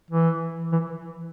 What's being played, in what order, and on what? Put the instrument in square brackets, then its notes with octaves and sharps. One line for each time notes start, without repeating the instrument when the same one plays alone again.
[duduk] E3
E3